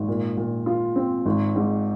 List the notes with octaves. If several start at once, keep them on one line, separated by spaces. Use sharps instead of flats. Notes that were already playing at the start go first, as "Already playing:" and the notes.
Already playing: G#1
A#2
A#2
F4
C4
G#1
G#2